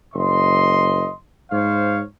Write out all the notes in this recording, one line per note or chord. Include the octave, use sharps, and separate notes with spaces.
F#1 D#5 C6
G#2 C5 C#5 F5